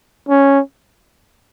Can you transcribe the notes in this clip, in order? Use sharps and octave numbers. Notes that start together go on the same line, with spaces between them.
C#4